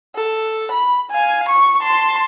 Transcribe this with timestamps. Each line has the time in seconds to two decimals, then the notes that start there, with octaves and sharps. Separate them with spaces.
0.16 A4
0.71 B5
1.11 F5 G#5
1.49 C#6
1.82 A5 C6